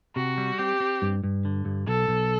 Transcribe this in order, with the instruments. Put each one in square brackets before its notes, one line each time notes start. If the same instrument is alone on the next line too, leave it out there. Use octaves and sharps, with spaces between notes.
[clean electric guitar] C3 [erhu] F#4
[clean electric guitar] G3
[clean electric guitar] C4 [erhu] G4
[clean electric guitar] C4
G2
G2
D3
G2
[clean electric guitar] B1 [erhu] A4
[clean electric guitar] B1